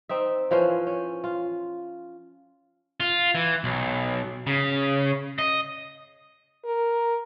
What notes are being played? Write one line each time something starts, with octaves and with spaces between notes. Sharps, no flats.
C4 D#4 E5
E3 F3 C#4 C5
C#4
F4
F4
E3
B1
C#3
D#5
A#4